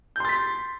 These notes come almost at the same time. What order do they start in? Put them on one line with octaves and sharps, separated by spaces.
G6 C6 A6 B6